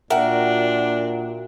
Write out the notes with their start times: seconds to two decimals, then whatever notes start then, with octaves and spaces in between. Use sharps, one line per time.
0.10 A#2 D4 F#4 A#4 E5 F#5 G5